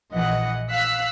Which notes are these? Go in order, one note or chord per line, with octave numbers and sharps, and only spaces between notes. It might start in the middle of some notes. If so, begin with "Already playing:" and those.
A#1 E3 D#5 F#5
F5 E6 F#6 B6